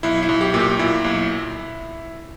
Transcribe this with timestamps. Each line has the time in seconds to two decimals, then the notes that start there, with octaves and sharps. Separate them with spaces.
0.03 B1 E4
0.23 E4
0.29 B1
0.41 G4
0.54 A#2
0.59 G4
0.79 A#2 E4
1.04 B1